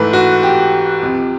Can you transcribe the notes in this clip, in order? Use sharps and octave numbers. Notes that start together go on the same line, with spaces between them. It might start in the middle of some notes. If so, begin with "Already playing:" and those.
Already playing: G#2 E3 A3 B4
F#4
G4
C#2 C3 F3